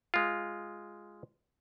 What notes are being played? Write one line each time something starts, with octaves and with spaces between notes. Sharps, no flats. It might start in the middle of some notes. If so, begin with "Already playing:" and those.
G#3 F4